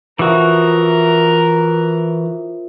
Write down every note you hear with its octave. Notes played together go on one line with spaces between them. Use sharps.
E3 F3 F#4 A#4 E5 D#6